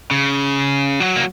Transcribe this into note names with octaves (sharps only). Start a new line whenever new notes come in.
C#3
F#3
A#3